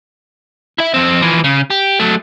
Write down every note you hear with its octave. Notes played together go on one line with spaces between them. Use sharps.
E4 E5
F2 C4
E3 F3
C#3
G4
F#3 A3